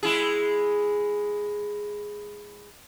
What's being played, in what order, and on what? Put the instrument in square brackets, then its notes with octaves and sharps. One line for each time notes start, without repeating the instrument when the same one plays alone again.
[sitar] G#3 E4 G#4